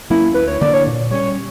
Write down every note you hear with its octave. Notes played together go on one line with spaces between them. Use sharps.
F#3 A#3 C#4 E4
D2 B4
C#5
D3 A#3 D4 D5
C#5
A#2
G3 C#4 C#5